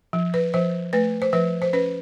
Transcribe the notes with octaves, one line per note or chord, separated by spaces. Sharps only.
F3
B4
F3 C5
A3 B4
C5
F3 B4
C5
C#4 B4